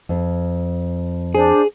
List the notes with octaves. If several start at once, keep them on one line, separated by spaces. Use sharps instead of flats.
F2
D4 G#4 C5